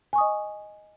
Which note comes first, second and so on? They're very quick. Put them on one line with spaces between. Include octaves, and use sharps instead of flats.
G#5 C#6 D#6 D#5